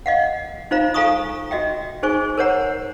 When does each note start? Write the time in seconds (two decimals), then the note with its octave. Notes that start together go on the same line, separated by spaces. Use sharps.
0.06 D#5 F5 F#5
0.71 D#4 F4 C5 F5 A#5
0.94 A4 F5 G#5 A#5 C#6 D#6
1.51 F#4 D#5 E5 G5
2.03 D#4 G#4 C5 G#5 C#6
2.38 A#4 C5 C#5 F#5 A#5